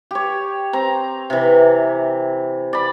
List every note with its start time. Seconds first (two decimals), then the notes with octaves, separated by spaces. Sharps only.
0.11 G4 C#5
0.73 C4 A#5
1.30 C3 E3
2.73 D5 B5